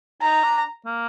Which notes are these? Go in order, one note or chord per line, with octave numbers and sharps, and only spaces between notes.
D#4 A#5
D4
A#3